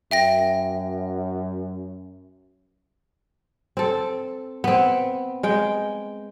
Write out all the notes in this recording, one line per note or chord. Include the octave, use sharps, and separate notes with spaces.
F#2 E5 G5 A#6
C4 A4
B3 C4
G#3 G5